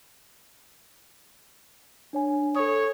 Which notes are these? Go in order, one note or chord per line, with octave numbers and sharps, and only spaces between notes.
D4 C#5 G#5
A4 C#5 D#6